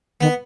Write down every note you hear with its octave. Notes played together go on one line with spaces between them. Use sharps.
D#3 B3